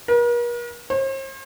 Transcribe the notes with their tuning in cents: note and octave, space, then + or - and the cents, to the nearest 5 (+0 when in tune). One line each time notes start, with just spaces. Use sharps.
A#4 +45
C5 +45